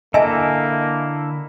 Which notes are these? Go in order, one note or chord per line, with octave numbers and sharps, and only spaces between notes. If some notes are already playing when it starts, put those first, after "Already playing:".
D3 A#3 E4 A4 D#5 E5 G#5